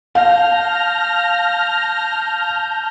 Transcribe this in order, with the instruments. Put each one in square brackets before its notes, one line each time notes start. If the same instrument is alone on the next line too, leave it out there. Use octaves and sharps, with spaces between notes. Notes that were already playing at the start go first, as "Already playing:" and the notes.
[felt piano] F5 [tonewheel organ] A5 G6 [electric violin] F6 A#6